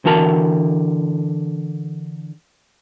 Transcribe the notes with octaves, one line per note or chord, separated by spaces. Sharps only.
D3 E3 F#4 A#4 A5 B5